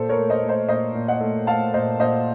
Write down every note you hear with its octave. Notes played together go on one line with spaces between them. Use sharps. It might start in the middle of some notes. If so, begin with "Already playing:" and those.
Already playing: A#2 A4 C5
A#4 C#5
A3
C5 D#5
A3
C5 D#5
A#2 C5 D#5
A#2
D#5 F#5
A3
A3 F5 A5
A#2 C5 D#5
A#2 C5 D#5